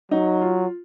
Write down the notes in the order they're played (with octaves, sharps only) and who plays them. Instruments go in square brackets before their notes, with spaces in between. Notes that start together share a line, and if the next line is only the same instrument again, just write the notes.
[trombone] F#3 [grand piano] D#4
[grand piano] F4